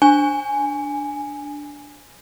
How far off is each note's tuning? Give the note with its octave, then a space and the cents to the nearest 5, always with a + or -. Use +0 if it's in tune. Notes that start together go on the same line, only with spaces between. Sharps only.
D4 +0 G#5 +0